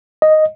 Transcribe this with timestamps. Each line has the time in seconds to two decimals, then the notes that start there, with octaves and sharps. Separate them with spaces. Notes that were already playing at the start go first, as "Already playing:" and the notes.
0.22 D#5